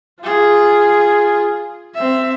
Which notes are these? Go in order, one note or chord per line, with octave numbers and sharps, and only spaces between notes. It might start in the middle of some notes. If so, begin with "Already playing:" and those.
F4 G#4
C4 E5